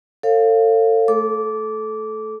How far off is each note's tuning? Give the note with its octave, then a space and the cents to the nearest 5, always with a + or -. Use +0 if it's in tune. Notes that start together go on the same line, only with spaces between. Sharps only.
A4 +30 C#5 -25 F5 +0
A3 +0 A4 -20 D6 -15